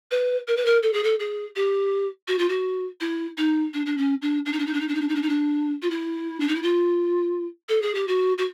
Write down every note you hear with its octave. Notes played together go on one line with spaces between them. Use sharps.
B4
A#4
B4
A#4
A4
G#4
A4
G#4
G4
F#4
F4
F#4
E4
D#4
D4
D4
C#4
D4
D4
D#4
D4
D#4
D4
D#4
D4
D#4
D4
D#4
D4
D#4
D4
F4
E4
D4
D#4
E4
F4
A4
G#4
G4
F#4
F#4